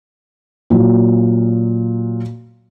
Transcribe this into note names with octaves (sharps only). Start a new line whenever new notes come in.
A#2 F#3